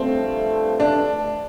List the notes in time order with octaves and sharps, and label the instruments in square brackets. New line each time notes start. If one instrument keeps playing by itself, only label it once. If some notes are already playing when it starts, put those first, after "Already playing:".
Already playing: [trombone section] G2 F3 A3 [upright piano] C4
[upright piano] D4